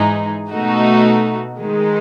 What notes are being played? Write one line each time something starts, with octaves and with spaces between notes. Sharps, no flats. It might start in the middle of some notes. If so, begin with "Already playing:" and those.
Already playing: G#2 E3 G#3 D#4 G#4
B2 A3 D#4 F#4
D#3 G#3 D#4